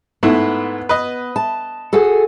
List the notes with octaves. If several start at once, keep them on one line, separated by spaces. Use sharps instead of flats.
G#2 A3 B3 E4
B4 D#5
A5
F#4 G#4 A4